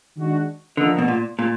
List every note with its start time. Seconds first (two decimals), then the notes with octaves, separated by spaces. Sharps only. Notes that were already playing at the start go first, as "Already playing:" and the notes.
0.17 D#3 G#3 D4 F#4
0.77 D3 F3 A#3 D#4
0.99 B2
1.08 A#2
1.39 A#2